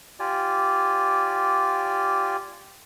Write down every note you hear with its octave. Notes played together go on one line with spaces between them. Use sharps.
F4 G4 D5 G#5